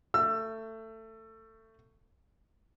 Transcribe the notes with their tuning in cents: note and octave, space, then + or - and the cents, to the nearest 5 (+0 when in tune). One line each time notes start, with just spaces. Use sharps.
A3 +20 E6 +25